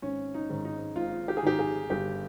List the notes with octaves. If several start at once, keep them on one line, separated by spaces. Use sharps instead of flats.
G#1 C#4
D#4
G#2 D#3
D#4
G#1 F4
G4
G#4
G#2 D#3 G4
G#4
G1 G4